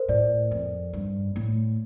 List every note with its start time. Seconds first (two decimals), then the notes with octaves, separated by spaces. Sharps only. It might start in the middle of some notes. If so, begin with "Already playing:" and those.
Already playing: A#4 C5
0.08 A2 D5
0.51 F2
0.93 G2
1.36 A2